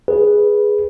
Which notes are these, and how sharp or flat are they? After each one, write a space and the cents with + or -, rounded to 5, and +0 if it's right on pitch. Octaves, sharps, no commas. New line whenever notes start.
G#4 +0 B4 -5